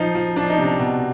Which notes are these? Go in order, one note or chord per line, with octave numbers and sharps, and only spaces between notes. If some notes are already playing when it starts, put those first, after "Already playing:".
Already playing: F3 D#4
F3
F3 D4
D#4
C3 D4
B2